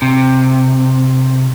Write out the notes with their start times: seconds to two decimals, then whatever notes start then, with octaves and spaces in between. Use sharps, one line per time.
0.02 C3